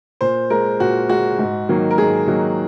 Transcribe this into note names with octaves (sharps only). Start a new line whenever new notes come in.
A#2 C5
G#3 A#4
A#2 F#4
G#3 F#4
G#2
D#3 F#3 A#3
A#4
G#2 G#4
D#3 F#3 A#3